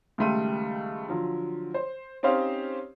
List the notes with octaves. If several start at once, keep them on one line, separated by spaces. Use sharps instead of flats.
C#2 D#3 G3 A3 C6 D#7
D3 F3 F#3
C5
C4 C#4 D#4 G4 C5 F5